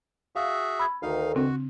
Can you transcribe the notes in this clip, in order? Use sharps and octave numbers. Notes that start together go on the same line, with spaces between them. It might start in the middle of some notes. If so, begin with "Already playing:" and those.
F#4 G#4 E5 F5 E6
B5 E6 G#6
D2 D#3 D#4 F5
C#3 C4 D4 F#4